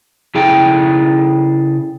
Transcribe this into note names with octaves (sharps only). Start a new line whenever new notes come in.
C#3 E4 G#4 A4 G5